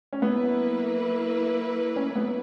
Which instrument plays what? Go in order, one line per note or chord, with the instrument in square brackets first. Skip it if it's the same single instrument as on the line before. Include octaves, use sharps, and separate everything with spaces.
[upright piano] C#4
[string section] F#3 A#3 E4 B4 [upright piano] B3
[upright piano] C#4
B3